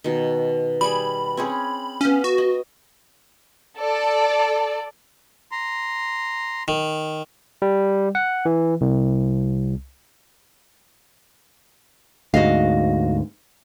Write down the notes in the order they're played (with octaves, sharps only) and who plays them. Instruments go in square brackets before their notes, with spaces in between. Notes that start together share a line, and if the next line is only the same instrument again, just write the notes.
[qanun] B2 D#3
[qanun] G3 G#4 [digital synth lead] B5
[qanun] C4 C#4 G#4
[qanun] B3 F5 [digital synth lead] C#4
[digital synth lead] F#4
[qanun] D#5
[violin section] A4 D5
[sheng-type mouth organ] A#5 C6
[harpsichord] D#3
[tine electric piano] G3
F#5
E3
C2
[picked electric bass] D2 G#2 [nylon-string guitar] F#4 D#5 F5